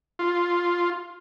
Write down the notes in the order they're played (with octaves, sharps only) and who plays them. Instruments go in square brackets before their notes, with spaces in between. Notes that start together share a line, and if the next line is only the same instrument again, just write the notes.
[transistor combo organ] F4